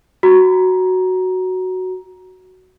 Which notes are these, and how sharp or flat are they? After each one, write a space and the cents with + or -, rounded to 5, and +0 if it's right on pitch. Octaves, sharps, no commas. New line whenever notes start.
F#4 +0 A#5 +15